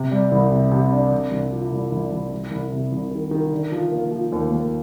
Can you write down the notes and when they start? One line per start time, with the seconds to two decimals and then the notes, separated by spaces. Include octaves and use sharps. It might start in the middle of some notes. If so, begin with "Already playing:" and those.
Already playing: C3
0.11 G3
0.31 C2
0.52 C3
0.72 C3
0.91 D4
1.12 C3
1.31 C2
1.52 F3
1.72 C2
1.92 C2
2.12 C2
2.32 C2
2.51 C2
2.72 C3
2.92 C2
3.11 D#3
3.31 D#3
3.52 D3
3.71 F3
3.92 A#3
4.12 F3
4.32 D#2
4.51 D#2